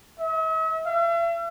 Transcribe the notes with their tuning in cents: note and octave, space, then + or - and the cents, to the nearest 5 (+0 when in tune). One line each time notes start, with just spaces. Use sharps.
E5 -45
E5 +45